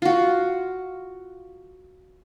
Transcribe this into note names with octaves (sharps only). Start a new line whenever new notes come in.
F4 F#4